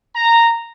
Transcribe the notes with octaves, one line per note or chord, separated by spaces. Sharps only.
A#5